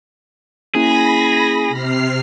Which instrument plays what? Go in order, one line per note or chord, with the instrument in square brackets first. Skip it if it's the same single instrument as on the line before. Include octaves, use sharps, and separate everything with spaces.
[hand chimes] A#3 C#4 E4 [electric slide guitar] G#4 [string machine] B5 A#6
[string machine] C3 F6 C7